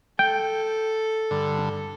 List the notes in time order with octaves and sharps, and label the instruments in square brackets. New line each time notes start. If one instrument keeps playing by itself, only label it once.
[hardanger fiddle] A4 [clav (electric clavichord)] G5
[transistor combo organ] G2 D3